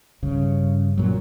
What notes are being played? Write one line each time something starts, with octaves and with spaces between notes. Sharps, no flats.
G2 C#3
A#2 F#3